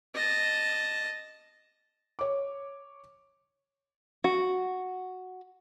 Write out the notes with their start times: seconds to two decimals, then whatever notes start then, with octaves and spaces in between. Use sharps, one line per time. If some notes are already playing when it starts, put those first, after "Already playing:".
0.15 D#5 A5
2.19 C#5 D6
4.24 F#4